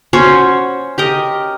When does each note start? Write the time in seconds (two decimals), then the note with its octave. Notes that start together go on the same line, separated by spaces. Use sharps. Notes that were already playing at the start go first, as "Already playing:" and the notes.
0.13 C#4 F#4 C5 C#5
0.98 G4 A#4 D#5